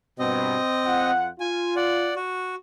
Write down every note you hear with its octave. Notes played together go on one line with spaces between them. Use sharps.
G2 B2 C4 D#5
F2 F4 F#5
F4 G#5
D5 F#5
F#4